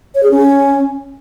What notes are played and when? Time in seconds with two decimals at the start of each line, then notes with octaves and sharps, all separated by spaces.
0.15 C#5
0.23 G#4
0.31 C#4